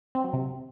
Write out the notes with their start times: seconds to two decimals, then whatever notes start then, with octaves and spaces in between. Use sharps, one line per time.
0.15 C4
0.24 F#3
0.33 C3